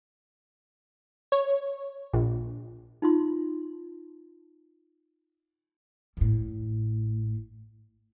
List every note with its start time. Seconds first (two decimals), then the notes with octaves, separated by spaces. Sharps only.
1.32 C#5
2.13 A#1
3.02 D#4 F4 C6
6.17 A1 A2